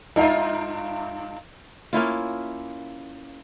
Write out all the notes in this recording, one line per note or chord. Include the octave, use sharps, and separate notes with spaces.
G2 D#4 F4 D#5 E5
A#3 C#4 E4 F4